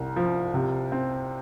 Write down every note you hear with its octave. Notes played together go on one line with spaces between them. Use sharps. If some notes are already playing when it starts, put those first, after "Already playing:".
Already playing: C2
F3
C3
C4